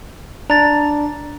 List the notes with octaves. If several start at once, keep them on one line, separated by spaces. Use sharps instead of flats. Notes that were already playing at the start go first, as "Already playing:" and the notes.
D4 A#5 A6 F7